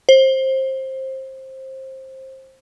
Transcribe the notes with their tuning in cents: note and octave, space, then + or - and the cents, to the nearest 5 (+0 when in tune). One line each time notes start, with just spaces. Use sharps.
C5 +20